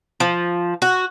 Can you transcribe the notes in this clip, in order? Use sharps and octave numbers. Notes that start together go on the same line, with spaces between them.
F3
F#4